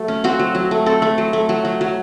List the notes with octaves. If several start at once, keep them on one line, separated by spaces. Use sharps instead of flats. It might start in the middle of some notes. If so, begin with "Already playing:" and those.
Already playing: F#3 A3
C#4
C4 F#4
F#3
F#3
A3
C4 A4
A3
F#3
A3
F#3
F#3
F#3